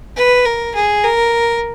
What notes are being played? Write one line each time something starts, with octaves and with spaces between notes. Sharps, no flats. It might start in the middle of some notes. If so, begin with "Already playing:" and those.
B4
A#4
G#4
A#4